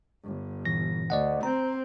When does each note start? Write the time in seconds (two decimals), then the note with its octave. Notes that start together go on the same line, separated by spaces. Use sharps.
0.24 G1
0.65 A#2 E3 A#6
1.10 D2 D5 D#5 F#5
1.43 C4 A#5